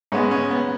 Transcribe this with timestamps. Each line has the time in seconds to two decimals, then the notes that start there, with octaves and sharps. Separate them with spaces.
0.12 G#2 G#3 B3 C#4
0.31 C#4
0.51 B3